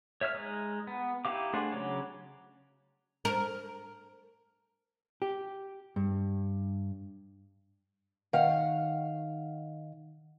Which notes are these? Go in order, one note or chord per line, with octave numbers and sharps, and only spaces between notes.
C#5 E5 E6 F6
G#3 D#4
B3
D#4 E4 G4 F5 D6
A3 D4 G#4 C5 F#5
C#3 F#3 C#5 D6
A#4
G4
G2
D#3 F5 F#5